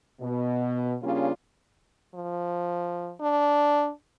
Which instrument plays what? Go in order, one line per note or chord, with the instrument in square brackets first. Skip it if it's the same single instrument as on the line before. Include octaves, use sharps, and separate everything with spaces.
[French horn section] B2
C#3 G3 A#3 C#4 D4 F4
[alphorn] F3
D4